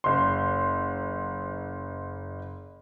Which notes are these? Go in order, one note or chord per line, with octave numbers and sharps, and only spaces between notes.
F#1 C6